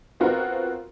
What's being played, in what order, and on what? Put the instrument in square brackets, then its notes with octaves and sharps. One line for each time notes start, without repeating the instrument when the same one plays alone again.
[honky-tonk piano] B3 C4 F4 F#4 A#4